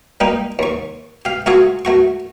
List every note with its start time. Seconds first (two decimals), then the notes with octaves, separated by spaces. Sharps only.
0.20 G3 A#3 D#4 G4
0.59 D#2 C#6
1.25 G4 F5
1.46 A3 F4 F#4 G#4 A4
1.85 A3 F#4 C#6